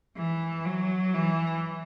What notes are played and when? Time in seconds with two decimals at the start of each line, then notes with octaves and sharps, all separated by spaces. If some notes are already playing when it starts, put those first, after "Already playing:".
0.17 E3
0.66 F#3
1.14 E3